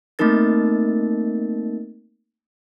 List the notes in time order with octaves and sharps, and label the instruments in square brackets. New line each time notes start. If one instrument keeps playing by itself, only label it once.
[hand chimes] A3 A#3 C4 D#4 A#4 A6